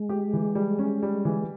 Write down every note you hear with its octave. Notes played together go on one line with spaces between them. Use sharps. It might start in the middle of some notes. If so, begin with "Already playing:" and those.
Already playing: G#3
G4
E3
G3
C#4
G3
E3